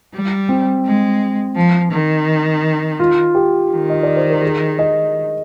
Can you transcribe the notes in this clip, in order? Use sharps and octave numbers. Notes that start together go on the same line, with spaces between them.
G3
C4
G#3
F3
D#3
F4
G4
D#3
D#5
D5
C5
A#4
G#4
D#5